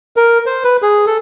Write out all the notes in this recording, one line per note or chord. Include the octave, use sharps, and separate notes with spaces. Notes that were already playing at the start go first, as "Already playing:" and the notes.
A#4
C5
B4
G#4
A4